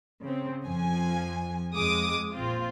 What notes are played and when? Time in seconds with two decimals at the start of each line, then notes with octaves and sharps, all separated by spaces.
0.21 C#3 C4
0.65 F2 F3 G#5
1.74 F2 G#3 D6 D#6
2.33 A#1 C4 F4